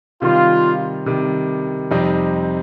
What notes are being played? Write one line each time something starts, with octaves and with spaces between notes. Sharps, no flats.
C3 D#3 G3 F4
C3 D#3 G3
F2 C3 G3 C4 D#4